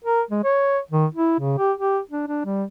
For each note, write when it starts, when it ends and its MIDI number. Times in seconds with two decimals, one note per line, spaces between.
0.04 0.22 70
0.30 0.43 56
0.44 0.79 73
0.91 1.06 51
1.15 1.35 64
1.40 1.58 49
1.58 1.72 67
1.77 2.00 67
2.11 2.26 62
2.28 2.44 62
2.45 2.64 55